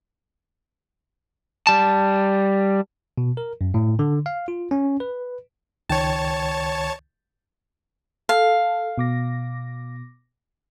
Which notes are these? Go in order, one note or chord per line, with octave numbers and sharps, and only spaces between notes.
G3 A5
B2
A#4
F#2
A2
D3
F5
F4
C#4
B4
C#2 D#3 C#5 G5 A5
A4 F5
B2 D6 A#6